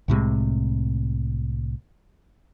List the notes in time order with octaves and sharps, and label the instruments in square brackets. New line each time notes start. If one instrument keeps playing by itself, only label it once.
[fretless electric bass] C2 A2 C3 G#3